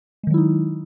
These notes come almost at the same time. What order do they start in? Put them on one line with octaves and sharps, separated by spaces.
G#3 D#3 F#3 E4 D#4